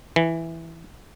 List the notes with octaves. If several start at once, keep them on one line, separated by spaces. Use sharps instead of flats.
E3